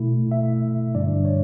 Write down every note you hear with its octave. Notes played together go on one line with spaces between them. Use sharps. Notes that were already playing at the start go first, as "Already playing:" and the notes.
Already playing: B2 A3 E4
E5
G2 D3 G3 D4 D5
C#5